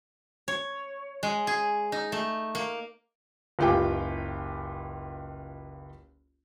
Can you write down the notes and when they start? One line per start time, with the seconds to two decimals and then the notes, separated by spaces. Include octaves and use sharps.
0.48 C#5
1.23 G#3
1.47 G#4
1.92 D#4
2.12 A3
2.55 A#3
3.59 F#1 C#2 F4 G4 G5 G#5